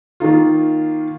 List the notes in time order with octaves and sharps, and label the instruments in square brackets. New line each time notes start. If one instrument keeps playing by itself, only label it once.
[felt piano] D#3 A#3 D#4 F4